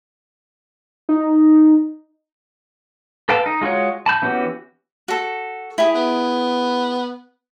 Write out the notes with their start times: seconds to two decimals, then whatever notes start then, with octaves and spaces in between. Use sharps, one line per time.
1.09 D#4
3.29 A4 B4 F5 G5 A5
3.46 D#4
3.61 G#3 F4 F#4 C#5
4.06 A5 B5 G6
4.22 E3 B3 C#4 F#4 G4
5.08 F#4 A4
5.78 E4 G4 G#4
5.95 B3